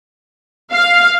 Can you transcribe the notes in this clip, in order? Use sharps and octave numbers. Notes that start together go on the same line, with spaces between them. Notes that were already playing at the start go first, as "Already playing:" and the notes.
F5